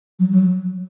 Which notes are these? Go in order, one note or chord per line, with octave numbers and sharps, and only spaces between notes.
F#3
F#3